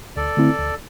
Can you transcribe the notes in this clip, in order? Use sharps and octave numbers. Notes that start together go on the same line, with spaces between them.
D2 A4 D5
D3 A3 C4 E4
D2